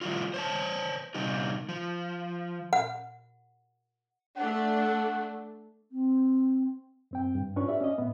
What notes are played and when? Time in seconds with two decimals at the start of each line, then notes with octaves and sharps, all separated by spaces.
0.01 F3 G3 A3 F4
0.34 C5 C#5 A5
1.15 C3 G3 D#4 G4
1.69 F3
2.73 F#5
4.37 A3 D4 F#5
5.92 C4
7.11 F#2 C4 G5
7.35 G2
7.56 G#2 C#4 D4 F4 B4 C#6
7.68 F#4 G4 D5 E5
7.81 C#4 D#5
7.97 A2 B3 E5